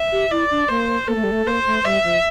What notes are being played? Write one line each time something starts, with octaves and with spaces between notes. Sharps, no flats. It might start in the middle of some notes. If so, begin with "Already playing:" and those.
Already playing: E5
G4
E4 D5
D4
A#3 C5
A#3 A4
A3
G3
A3
A#3 C5
A3
G3 E5
F3